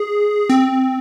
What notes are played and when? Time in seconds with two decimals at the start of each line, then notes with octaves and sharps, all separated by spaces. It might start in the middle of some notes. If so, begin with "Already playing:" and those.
Already playing: G#4
0.49 C4